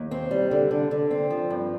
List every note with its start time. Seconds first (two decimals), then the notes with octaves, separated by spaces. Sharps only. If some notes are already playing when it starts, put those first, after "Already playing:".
Already playing: D#2
0.11 C4
0.31 G3
0.51 D3
0.71 D3
0.91 D3
1.11 C4
1.30 F3
1.50 G2